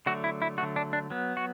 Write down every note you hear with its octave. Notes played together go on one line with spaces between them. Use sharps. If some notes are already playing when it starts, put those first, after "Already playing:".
D3 F#3 A3 F#4
E4
E4
D3 F#3 A3 F#4
D4
D4
F#3 B3
F#4